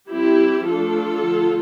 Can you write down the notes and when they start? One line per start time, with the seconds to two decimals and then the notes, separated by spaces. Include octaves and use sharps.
0.10 G3 C4 E4 G4
0.67 F3 A3 D4 F4 A4
1.24 D3 F3 A3